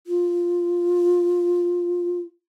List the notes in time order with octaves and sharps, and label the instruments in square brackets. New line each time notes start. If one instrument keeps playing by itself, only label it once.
[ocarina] F4